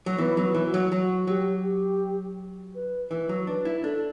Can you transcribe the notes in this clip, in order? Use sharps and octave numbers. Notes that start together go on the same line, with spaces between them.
F#3
E3 B3
F#3
B3
E3
F#4
F#3
F#3 F#4
F#3 G4
G4
B4
E3 B4
F#3
D4 B4
E4
D4 A4